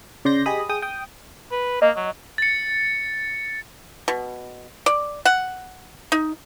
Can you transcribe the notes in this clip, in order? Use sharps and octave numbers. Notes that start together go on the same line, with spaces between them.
C#3 D5 C6 G6 A#6
G4 G#4 D#5 B5 D#6
G#4 G5 D#6
G5 D#6
B4
A#3 D#5
F#3
A6 C#7
B2
D5
F#5
D#4